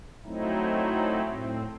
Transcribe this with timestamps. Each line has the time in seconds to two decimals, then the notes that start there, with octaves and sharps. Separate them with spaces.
0.25 F#3 A3 C4 D#4 E4
1.26 A2 C4